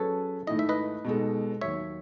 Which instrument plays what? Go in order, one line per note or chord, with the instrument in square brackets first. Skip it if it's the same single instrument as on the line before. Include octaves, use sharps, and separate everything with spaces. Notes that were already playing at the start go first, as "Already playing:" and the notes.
Already playing: [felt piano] F#3 C#4 G#4 B4 [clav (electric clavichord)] A4 C#5
[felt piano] G#2 D#3 A3 E4 [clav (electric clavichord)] D#5
[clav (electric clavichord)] E5
B4 D#5
[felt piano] B2 G#3 D#4 A4
[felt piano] D#2 D#3 F#3 [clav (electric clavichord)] C#5 E5